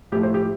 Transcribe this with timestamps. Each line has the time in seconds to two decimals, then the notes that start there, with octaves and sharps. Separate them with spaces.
0.12 A2 F3 A3 G4
0.23 C5
0.34 G4